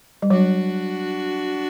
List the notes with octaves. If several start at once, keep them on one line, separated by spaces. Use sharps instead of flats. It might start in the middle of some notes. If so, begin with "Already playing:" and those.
G3
F#3 D4 F#4